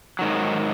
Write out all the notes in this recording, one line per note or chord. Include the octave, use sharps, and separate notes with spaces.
G#2 D#3 F#3